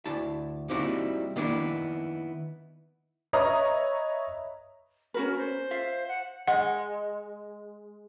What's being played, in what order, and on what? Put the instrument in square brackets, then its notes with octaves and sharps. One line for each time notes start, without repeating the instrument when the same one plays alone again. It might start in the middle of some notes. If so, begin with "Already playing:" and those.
[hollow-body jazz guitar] D2 E4 A5
G3 A#3 C4 D#4 E4 F#4
D#3 A#3 B3 D4 E4
[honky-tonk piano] B4 C#5 D#5 E5 A#5 D#6
[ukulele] C#4 F#4 B4 [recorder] A#4
[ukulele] C#4 [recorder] C5
[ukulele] F4 E5 F5
[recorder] F#5
[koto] G#3 [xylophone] F#5